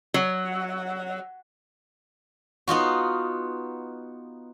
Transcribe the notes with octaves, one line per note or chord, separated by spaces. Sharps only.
F#3
B3 D#4 F4 F#4